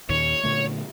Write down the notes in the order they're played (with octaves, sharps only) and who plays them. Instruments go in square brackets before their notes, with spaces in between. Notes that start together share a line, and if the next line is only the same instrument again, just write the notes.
[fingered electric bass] D#2 A#2 D#3 [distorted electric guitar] C#5
[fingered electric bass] A#2 D3 A3